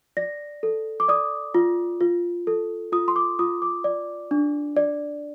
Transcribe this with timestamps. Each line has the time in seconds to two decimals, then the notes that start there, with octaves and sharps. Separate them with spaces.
0.17 D5 A#6
0.63 A4
1.00 D6
1.08 D5 D#6
1.55 F4
2.01 F4
2.47 A4
2.92 F4 D#6
3.08 C6
3.16 D6
3.39 F4 D#6
3.62 D6
3.84 D5
4.31 D4
4.77 D5